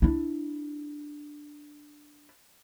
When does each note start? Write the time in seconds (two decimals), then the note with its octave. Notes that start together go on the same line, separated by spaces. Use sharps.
0.02 D4 E4